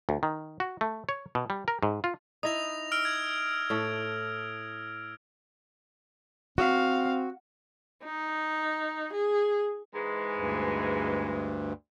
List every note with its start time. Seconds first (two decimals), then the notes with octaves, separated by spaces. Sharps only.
0.09 D2
0.23 D#3
0.60 F#4
0.81 A3
1.09 C#5
1.35 B2
1.50 G3
1.68 A#4
1.83 G#2
2.04 F4
2.43 D#4 E4 D#6 A#6 F7
2.92 E6 F6 D7
3.05 G#6
3.70 A2 A4
6.58 C4 F#4 F5
8.04 D#4
9.13 G#4
9.94 G#2 E3 G#3
10.37 D2 G2